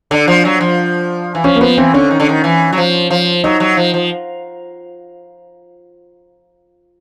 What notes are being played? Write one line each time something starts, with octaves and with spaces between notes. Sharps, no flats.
D3 D4
F3
F#3
F3
E3
F3 C#4
A#3
F3 B3
E3 C4
D3 C#4
D#3
D3
D#3
E3
F#3
F3
F3
F#3 D#4
F#3
F3
F3